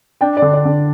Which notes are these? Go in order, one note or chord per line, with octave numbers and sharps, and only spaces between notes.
D4 G5
D5
D3
D5
D3